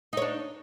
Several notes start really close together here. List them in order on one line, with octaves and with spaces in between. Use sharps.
D#4 C#5 D4